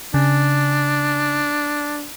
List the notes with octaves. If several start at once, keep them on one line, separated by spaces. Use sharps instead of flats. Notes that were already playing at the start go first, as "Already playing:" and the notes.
C#3 D4